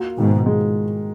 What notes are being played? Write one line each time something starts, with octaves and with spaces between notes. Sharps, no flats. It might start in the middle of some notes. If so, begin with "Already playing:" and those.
Already playing: A#3 F4 F#4
G#2 B2 D#3
G#3